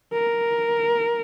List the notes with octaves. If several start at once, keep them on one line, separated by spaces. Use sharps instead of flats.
A#4